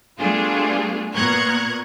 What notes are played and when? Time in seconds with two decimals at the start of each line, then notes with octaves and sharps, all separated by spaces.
0.19 G3 A3 B3 D4 F4 G#4
1.14 A#2 B3 A#5 C#6 F#6 G#6